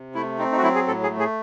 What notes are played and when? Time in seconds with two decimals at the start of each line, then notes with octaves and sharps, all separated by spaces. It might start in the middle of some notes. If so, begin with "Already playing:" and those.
Already playing: C3
0.15 A3 E4
0.38 C4 D#4
0.52 D#4
0.57 F#4
0.63 F#3 E4
0.75 G#4
0.87 A2 A4
1.03 G#4
1.11 A3
1.19 G#4